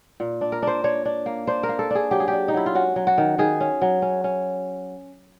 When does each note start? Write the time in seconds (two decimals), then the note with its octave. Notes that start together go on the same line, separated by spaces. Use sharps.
0.20 A#2
0.41 D4
0.52 A#4
0.62 D4 C5
0.84 D4 C#5
1.05 D4
1.26 A#3
1.47 D4 C5
1.63 A#4
1.69 A#3
1.79 A4
1.91 D4 G#4
2.11 F#3 G4
2.20 G#4
2.28 D4 G4
2.48 D#4
2.54 F#3 E4
2.66 F4
2.75 C#4 F#4
2.96 F#3
3.07 F#4
3.18 D#3
3.38 D#3 G#4
3.61 C#4
3.82 F#3
4.02 C#4
4.24 C#4